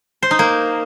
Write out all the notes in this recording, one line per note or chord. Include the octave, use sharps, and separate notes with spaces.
C5
D#4
A#3